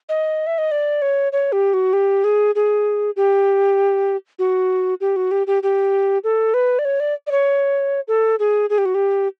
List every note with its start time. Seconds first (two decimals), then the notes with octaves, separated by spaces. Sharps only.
0.09 D#5
0.47 E5
0.58 D#5
0.71 D5
1.02 C#5
1.32 C#5
1.52 G4
1.74 F#4
1.93 G4
2.24 G#4
2.55 G#4
3.16 G4
4.39 F#4
5.01 G4
5.16 F#4
5.31 G4
5.47 G4
5.63 G4
6.24 A4
6.54 B4
6.79 D5
6.85 C#5
7.00 D5
7.27 D5
7.31 C#5
8.08 A4
8.39 G#4
8.70 G#4
8.78 G4
8.85 F#4
8.95 G4